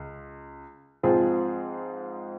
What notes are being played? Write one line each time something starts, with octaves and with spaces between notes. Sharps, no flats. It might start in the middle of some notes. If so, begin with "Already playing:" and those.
Already playing: C#2
G#2 F3 C4 F4 G#4